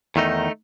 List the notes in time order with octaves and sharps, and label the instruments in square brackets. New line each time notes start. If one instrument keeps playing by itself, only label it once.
[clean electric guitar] E2 D#3 A3 D#4